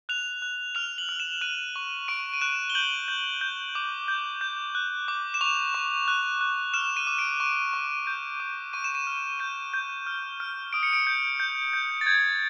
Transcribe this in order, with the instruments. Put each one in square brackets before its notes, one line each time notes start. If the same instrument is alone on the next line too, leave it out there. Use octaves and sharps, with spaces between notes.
[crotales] F#6 F7
F#6
F6 F7
F#7
F6
E7
F#6 D#7
C#6
C#6 D7
D#7
F#6 E7
G7
G6 F#7
G6
G6
D6
G6
G6
F#6
D6
E7
C#6 F7
C#6
F#6
F#6
F6 E7
D#7
D6
D7
C#6
C#6
G6
D6
C#6 D#7
E7
D#7
F6
G6 D#7
G6
F6
F6
D#6 D7
C#7
D7
G6
G6
G6
A6
G6 G#6